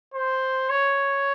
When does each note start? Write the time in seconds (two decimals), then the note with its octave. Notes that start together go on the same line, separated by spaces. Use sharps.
0.14 C5
0.69 C#5